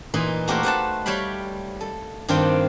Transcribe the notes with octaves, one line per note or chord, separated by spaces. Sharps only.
A#2 E3 D#4 B5 C6
A3 A#3 F#4 G4 A#4 C5
B4 C5 F#5 A5
G3 C#5 F5 G5 B5
A4
G2 D#3 C4 D4 F4 G5